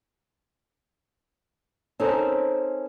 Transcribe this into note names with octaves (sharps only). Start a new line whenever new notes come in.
C4 C#4 D#4 A4 A#4 C5